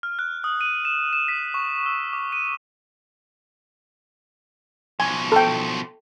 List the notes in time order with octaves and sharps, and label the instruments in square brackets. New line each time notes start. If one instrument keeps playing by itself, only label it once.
[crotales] F6
F#6
D#6
D#7
E7
E7
B6
C#6
E6
D6
D#7
[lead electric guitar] B2 F3 [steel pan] G#5
[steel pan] A4 G5